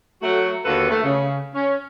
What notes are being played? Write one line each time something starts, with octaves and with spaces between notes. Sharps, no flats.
F#3 A3 F#4
D#2 D3 F4 F#4 A4 B4
A3
C#3
C#4